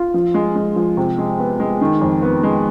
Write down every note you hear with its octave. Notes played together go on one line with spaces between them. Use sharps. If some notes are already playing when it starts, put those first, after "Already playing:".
Already playing: F4
F3
G#3
G#3
F3
C3
G#3
B3
G#3
D#3
F2
B3
G#3